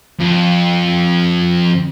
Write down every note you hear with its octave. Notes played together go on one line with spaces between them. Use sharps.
F2